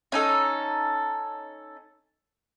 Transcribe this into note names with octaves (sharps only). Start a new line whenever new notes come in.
C#4 D#4 A4